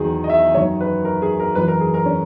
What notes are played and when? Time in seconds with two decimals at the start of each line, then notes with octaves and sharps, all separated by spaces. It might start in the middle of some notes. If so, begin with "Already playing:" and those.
Already playing: E2 D#3 F#3 G#4
0.24 D#5
0.29 E5
0.54 F#2 D#3 F#3 C#5
0.81 B4
1.05 A#4
1.22 G#4
1.40 A#4
1.55 F#2 E3 B4
1.68 A#4
1.80 G#4
1.94 A#4
2.05 C#4